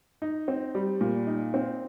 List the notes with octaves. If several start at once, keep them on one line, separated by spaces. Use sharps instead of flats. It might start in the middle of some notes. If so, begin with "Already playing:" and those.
D#4
C4
G3
A#2
D#4
C4